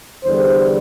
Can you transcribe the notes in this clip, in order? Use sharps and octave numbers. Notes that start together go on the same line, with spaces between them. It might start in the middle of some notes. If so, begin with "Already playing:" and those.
E2 D3 G3 C5